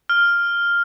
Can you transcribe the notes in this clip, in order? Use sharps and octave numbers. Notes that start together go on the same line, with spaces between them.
F6